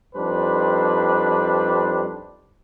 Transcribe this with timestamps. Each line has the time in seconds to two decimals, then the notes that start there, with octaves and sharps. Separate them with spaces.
0.15 F2 G3 D4 D#4 B4 C5